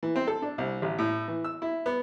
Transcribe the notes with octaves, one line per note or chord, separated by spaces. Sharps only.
E3
C4
A4
D4
C2
A1
A2
E3
E6
E4
B3